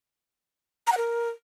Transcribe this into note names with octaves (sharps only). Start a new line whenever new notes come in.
A#5
F#5
A#4